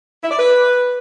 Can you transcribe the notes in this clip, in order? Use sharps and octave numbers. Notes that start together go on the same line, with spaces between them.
E4
D5
B4